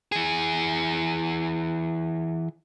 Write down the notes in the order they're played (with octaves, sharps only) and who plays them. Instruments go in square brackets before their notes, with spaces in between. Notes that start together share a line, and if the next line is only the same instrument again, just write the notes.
[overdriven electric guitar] E3 G#4